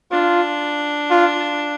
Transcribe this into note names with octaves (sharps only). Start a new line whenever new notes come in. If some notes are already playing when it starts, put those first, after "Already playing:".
D4 F4
F4